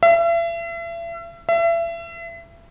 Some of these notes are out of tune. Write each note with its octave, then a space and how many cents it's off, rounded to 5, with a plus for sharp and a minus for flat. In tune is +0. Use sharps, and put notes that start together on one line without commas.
E5 +40
E5 +35